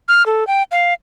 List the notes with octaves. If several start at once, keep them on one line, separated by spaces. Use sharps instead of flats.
F6
A4
G5
F5